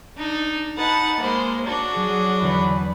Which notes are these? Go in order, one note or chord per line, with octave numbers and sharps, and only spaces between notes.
D4 D#4
D#4 B4 F#5 A5
G#3 A#3 C5
D4 F#4 A5 C#6
F#3 G#4
E2 D3 E3 B4